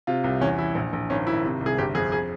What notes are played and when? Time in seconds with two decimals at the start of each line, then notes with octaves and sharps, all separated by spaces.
0.07 C3 F4
0.24 C2
0.41 E2 C#4
0.58 E3 E4
0.75 A#1
0.93 A#1
1.10 G#1 C#4
1.27 G#1 E4
1.44 C3
1.61 C2
1.66 G#4
1.78 G1 G4
1.95 F2 G#4
2.12 G#4